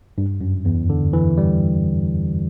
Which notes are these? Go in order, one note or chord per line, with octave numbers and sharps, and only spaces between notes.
G2
F#2
E2
D3
E3
G3